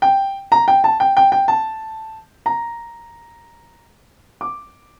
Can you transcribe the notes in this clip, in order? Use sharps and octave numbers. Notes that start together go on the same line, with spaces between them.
G5
A#5
G5
A5
G5
G5
G5
A5
A#5
D6